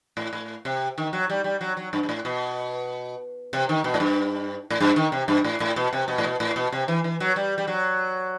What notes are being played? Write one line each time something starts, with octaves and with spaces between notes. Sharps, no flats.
A2
A2
C3
D#3
F#3
G3
G3
F#3
F#3
G2
G2
A2
B2
C3
D#3
B2
A2
G2
A2
G2
D#3
C3
G2
A2
A2
B2
C3
B2
A2
B2
A2
B2
C3
E3
E3
F#3
G3
G3
F#3